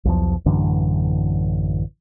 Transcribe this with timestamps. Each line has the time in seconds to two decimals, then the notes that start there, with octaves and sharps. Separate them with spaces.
0.05 B1 E2 F3
0.46 A1 F#2 D3 E3